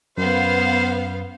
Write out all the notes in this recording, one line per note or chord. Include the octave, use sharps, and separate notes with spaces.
F#2 B3 C5 F5